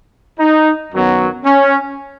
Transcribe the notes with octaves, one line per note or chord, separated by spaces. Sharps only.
D#4
F#2 D#3 F#3 B3
C#4